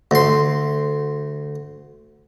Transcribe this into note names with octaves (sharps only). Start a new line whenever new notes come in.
D2 C6